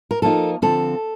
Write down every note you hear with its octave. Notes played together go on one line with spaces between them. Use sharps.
A#4
F3 A#3 D#4 A4
D3 F3 C4 A4